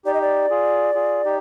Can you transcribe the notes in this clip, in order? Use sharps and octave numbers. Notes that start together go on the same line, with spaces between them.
D#4 G4 D5
D#5
D5
F4 G#4
F4 G#4
D#4 G4